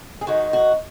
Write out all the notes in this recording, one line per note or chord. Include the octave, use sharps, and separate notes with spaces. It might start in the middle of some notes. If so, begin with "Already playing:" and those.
G#4
G#2 D#3 G#3 D#4 F#4
F#4